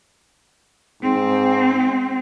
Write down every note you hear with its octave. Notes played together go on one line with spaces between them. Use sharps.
G#2 C4